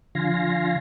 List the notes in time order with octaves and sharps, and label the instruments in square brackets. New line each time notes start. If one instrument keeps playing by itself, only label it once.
[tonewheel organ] D3 F3 F5 G#5 C6 A#6